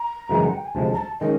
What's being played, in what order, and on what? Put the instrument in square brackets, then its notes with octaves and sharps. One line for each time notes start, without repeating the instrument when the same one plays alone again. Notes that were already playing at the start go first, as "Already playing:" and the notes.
Already playing: [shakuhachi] A#5
[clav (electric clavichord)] F#2 C#3 E3 G#3
[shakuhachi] F#5
G5
G#5
[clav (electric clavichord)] D2 C3 F3 G#3 [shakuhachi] A5
[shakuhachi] A#5
A5
[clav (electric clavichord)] D#3 G#3 C#4 [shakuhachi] D#5